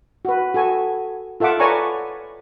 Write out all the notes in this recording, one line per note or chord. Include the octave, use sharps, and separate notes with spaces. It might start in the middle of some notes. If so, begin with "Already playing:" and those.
F#4 B4
F#4 A4 G#5
F4 A4 E5 F#5 D6
B4 C#5 D5 G#5 A#5 C#6